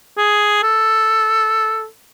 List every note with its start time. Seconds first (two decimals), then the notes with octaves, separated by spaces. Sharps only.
0.17 G#4
0.63 A4